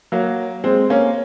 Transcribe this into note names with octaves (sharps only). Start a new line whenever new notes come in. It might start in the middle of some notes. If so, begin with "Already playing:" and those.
F#3 A#3
G#3 C4
A#3 C#4